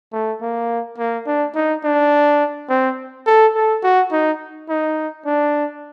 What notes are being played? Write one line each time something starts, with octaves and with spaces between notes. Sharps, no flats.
A3
A#3
A#3
D4
D#4
D4
C4
A4
A4
F#4
D#4
D#4
D4